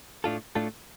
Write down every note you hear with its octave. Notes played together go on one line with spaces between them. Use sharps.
A2 A3 D4 F4 A4
A2 A3 D4 F4 A4